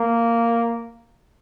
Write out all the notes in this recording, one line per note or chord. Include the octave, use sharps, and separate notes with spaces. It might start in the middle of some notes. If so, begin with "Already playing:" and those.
Already playing: A#3